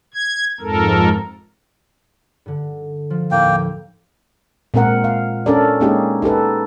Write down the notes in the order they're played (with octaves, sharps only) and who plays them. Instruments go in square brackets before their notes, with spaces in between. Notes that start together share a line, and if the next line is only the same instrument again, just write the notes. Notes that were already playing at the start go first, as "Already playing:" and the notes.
[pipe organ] G#6
F2 G#2 A4 A#4
[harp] G2 D3
F3
[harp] D#2 A2 [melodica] A#3 G5
[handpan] A#2 G#3 C4 A#4 F#5
F5
C#4 D4 A4 A#4 D5
G#3 A#3 C#4 D#4 G4 G#4
D#4 G4 A4 B4